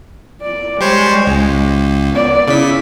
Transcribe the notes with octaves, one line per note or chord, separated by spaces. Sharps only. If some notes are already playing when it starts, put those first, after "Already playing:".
D5
G3 G#3 C5 C#5
C#2
B3 D5
C#3 E4 B6